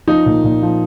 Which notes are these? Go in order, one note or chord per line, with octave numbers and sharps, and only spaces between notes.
F3 D#4
A#2
A#2
F3